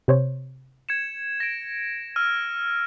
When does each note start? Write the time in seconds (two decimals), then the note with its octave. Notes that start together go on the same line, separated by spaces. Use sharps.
0.08 C3 C5 C#5
0.89 G#6 C#7 E7
1.40 A#6 D7
2.16 E6 F6 D#7